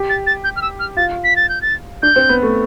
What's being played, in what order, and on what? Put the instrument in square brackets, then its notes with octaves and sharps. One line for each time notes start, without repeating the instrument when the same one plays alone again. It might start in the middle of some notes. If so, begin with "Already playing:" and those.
Already playing: [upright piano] G4
[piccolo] A6
A6
G6
F6
E6
F6
[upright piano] F4 [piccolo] A6
[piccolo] B6
A6
G6
A6
[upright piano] D4 [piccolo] G6
[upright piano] C4
B3
A3